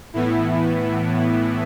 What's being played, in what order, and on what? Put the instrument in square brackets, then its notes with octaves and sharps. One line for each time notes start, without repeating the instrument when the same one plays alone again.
[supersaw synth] A2 E3 B3 E4